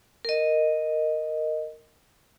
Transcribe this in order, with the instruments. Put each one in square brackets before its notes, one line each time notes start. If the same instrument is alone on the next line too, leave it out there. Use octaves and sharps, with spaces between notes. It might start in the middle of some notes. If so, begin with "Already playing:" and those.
[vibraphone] A#4 D#5